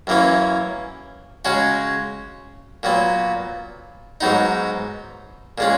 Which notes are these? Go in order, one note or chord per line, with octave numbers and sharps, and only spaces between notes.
F#2 E3 A#3 C#4
C#3 G#3 C#4 F#4
A#2 F#3 B3
G#2 F#3 B3 D#4
A#2 G#3 C#4